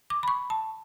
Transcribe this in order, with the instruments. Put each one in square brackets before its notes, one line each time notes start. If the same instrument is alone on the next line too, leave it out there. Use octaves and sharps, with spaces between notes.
[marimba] D6
B5
C#6
A5